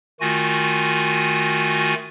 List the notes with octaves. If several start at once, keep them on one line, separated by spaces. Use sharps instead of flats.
D#3 A3 F4 F#4 G#5 A#6